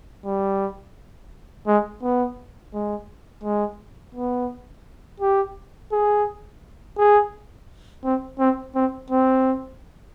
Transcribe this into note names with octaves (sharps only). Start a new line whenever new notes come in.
G3
G#3
B3
G#3
G#3
B3
G4
G#4
G#4
C4
C4
C4
C4